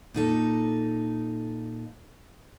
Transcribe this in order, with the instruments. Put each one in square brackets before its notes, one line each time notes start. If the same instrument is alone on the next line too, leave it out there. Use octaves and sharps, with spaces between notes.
[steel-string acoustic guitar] A#2 D#4 A4